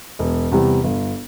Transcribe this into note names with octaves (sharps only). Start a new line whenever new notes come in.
E1
E2 C3 G3
G1